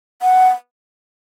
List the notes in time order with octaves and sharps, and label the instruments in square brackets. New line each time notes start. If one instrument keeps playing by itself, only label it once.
[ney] F#5